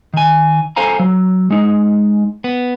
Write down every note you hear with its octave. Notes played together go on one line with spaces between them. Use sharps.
D#3 G#5
A4 C5 F5 G#5 A#5
F#3
G#3 D#4
B3